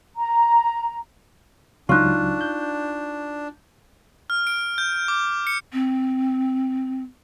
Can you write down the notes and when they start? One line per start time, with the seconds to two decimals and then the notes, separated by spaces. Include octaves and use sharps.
0.16 A#5
1.89 C#2 F#3 D4 D#4 F4 C#6 F#6
2.41 G6
4.30 F6
4.47 D7
4.78 G6
5.08 D6
5.47 C#7
5.73 C4